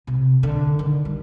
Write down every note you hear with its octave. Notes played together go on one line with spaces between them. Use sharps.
C3
D3
D#3
G3